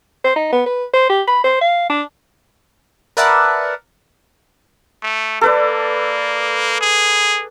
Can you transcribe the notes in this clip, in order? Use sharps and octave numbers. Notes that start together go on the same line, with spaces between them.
C5
D#4
B3
B4
C5
G4
B5
C5
F5
D4
A#4 B4 D5 E5 F#5 A5
A3
A#3 A4 B4 D5
G#4